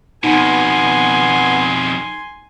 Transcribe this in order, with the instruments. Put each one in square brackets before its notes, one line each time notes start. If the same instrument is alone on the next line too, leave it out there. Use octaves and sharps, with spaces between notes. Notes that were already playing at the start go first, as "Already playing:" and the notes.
[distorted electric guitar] F2 B2 [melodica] B3 [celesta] D#4 [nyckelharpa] G#5 C6